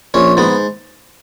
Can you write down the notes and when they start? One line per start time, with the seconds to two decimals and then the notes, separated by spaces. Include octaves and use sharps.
0.14 A#1 C#4
0.37 G#2 B3